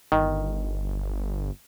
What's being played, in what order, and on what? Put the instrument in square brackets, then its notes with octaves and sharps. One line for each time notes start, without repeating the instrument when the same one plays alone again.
[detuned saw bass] G1 [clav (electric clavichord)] D#3